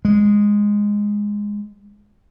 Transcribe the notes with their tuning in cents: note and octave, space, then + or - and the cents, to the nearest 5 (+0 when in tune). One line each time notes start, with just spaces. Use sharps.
G#3 -10